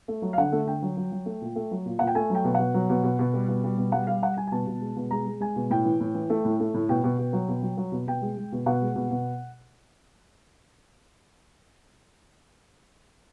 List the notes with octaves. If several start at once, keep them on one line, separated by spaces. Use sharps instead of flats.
A3
F#3
F5
D3 F#5
A3
D3 G5
F#3
F#3
F#3
A3
A#2
A3
F#3
A#2
A#2 F#5
G5
A3 G#5
F#3 G5
B2
B2 F#5
F#3
B2
B2
B2
G3
B2
G3
B2
G3 F#5
G3 F5
G3 F#5
G3 G#5
G#5
B2 A5
B2
G#3
B2
G#3 A#5
G#3
G#3 G#5
B2
A2 G5
E3
A2
E3
A3
A2
A3
A2
B2 G5
B2
B2
F#3
B2
F#3
F#3
B2
B2 G5
G#3
G#3
B2
B2 F#5
G#3
B2
B2